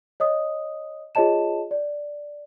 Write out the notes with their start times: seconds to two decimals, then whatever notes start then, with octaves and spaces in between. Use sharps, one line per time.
0.20 C#5 D#5 D#6
1.15 F4 G#4 C#5 D#5 A5 E7
1.71 D5